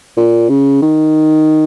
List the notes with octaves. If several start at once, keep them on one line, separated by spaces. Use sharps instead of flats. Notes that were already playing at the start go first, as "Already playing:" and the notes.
A#2
C#3
D#3